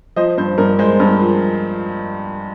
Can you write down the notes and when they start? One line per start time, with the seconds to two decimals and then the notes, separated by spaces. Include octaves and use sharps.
0.16 F3 C5 D#5
0.38 G2 C5
0.58 G2 A#4
0.79 G#3 C5
1.00 G2 A#4
1.21 F3